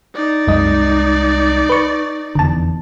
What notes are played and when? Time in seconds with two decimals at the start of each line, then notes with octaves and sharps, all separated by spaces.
0.15 D#4 D5
0.47 C2 F#2 G#3 D#5
1.70 B4 C#6
2.35 F1 E2 D3 A5